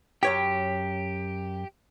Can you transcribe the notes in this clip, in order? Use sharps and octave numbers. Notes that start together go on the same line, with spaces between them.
F#2 G4 C#5 G5